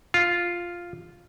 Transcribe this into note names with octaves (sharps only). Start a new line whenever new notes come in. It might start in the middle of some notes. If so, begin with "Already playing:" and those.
F4